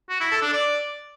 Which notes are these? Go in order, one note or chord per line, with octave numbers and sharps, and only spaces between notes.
F#4
E4
A4
D4
D5